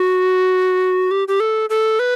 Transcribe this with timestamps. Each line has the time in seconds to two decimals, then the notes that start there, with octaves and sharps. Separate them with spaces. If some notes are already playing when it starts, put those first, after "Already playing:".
Already playing: F#4
1.11 G4
1.28 G4
1.40 A4
1.70 A4
1.99 B4